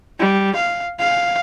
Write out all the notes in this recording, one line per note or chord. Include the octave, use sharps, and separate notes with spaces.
G3
F5
F5